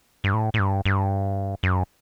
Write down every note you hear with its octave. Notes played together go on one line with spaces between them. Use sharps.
G2
A2
A2
G2
G2
F#2